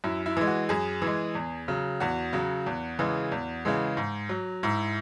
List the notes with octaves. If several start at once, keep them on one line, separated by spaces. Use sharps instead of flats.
F#2 E4
E4
E3 G#3
F#4
F#2 G#4
E3 G#3
E2
C#3 F#3
E2 F#4
C#3 F#3
E2
C#3 E3 G#3
E2
C#3 E3 G#3
G#2
F#3
G#2 E4